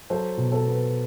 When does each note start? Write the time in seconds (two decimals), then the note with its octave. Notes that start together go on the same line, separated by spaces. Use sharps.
0.10 F#3 A4 C5
0.38 B2
0.52 A4 C5
0.66 B3